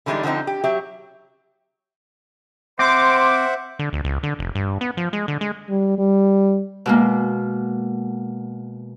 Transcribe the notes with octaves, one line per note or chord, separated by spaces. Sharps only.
D3 E3 G3 G#3 D4 D#4
D3 F3 B3 C4 D#4
G4
F#3 G4 E5
C4 C5 E5 F#5 C6 D6
D3
D2
C#2
D3
F1
G2
B3
F3
G#3
D3
G#3
G3
G3
B2 G#3 A#3